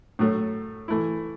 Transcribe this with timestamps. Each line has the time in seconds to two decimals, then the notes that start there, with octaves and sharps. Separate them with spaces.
0.19 A2 F#3 A3
0.88 E3 A3 E4